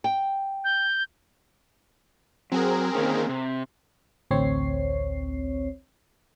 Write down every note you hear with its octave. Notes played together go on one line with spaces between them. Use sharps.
G5
G6
F#3 C4 G#4 A#4
D#3 A#3 C#4
C3
A1 D2 C4 C#5 C7